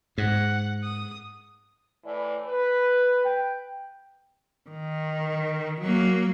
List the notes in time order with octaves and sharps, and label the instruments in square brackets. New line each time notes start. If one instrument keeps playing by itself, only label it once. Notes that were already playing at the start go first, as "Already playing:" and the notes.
[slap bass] G#2 [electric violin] F#5
[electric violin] D#6
[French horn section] A2 E3 D5
B4
[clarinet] G5
[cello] D#3
F#3 A#3